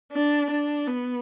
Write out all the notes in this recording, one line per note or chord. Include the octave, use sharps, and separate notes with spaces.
D4
D4
B3